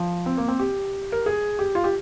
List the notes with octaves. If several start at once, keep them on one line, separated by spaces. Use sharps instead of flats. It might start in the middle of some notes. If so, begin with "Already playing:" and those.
Already playing: F3
C4
A#3
C4
G4
A#4
G#4
G4
F4
G4